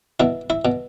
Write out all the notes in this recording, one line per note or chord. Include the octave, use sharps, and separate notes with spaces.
B2 E4
E4
B2